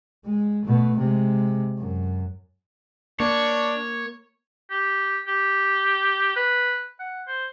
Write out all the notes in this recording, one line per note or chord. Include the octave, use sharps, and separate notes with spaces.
G#3
B2 A3
C3 G#3
F#2
A#3 D4 C#5
G4
G4
B4
F#5
C5